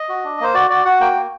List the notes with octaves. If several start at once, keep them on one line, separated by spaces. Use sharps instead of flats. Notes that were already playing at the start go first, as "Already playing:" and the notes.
Already playing: D#5
F#4
D4
A#3 C5
F#4 D5
F#4 D5
F#4 F#5
A#3 G5
A#3